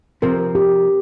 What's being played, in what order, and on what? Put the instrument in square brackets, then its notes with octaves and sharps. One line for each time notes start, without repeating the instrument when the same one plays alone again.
[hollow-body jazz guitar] C3 F3 C4 [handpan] A#4
[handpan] G4